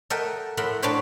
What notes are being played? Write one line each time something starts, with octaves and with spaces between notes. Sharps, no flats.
A4 A#4 D#5 E5 F#5 G5
A2 A#4 E5 F#5 B5 C6
A2 D4 C5 C#5 G5 B5